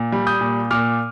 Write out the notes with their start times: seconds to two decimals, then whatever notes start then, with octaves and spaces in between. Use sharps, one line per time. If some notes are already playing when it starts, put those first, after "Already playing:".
Already playing: A#2
0.12 G3
0.27 D#6 G6
0.41 A#2
0.71 A#2 D6 F6